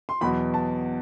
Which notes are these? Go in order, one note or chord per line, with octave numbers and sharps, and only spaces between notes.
C6
E2 B2 F#3 B5
A5